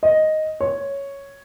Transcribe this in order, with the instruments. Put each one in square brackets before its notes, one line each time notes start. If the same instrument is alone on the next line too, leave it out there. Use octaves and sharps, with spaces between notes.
[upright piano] D#5
C#5